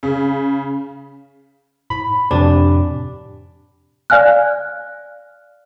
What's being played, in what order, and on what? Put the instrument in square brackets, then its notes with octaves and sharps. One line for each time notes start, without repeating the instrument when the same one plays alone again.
[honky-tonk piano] C#3
[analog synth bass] A2 [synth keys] B5
[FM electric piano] F2 C3 G4 [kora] D4
[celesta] D5 F5 G#5 F6 F#6